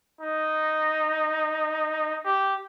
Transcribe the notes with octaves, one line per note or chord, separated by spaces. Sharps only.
D#4
G4